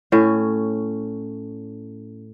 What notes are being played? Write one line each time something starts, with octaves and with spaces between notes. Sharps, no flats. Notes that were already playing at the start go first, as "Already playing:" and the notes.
A2 C#4